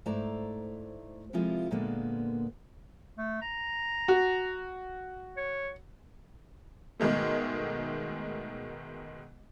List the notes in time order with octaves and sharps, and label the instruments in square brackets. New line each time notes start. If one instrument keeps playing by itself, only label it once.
[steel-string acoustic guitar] G#2 A3 E4 C5 D5 A#5
C3 F3 G#3 E4 F4 A4
A#2 D3 G#3 A#3 B3
[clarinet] A3
A#5
[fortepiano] F#4
[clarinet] C#5
[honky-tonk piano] G#2 B2 D#3 G#3 A3